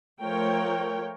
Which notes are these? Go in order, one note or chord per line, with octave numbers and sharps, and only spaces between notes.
F3 A3 A#4 C#5 G5